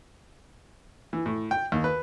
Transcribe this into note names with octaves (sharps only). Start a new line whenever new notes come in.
E3
A2
G5
D#2
B4